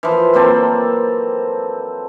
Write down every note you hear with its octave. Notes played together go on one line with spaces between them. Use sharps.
E3 F3
F#3 A#3 C4 A4